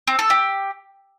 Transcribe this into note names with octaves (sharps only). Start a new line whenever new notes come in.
C4
A4
G4